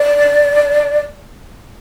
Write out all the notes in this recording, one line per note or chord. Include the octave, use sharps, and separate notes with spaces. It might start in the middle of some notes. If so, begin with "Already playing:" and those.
Already playing: D5